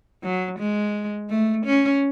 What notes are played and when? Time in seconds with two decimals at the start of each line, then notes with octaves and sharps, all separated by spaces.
0.23 F#3
0.59 G#3
1.30 A3
1.66 C#4